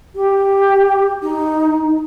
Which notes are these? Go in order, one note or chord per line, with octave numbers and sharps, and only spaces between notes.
G4
D#4